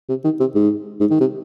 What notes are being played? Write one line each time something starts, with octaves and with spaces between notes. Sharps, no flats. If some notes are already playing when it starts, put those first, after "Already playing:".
C3
D#3
C3
G#2
G#2
D#3
C3